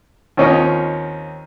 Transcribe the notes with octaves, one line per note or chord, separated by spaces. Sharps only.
D#2 C4 C#4 D#4 F4 D#5